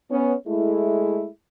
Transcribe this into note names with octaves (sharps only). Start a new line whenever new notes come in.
B3 C#4
G#3 A3 E4